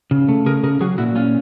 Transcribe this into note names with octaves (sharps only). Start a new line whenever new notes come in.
C#3
A3
C#3 G#4 A#4
C#3 G#4 A#4
F#3 F#4 G#4
A#2 E4 F#4
C#4 F4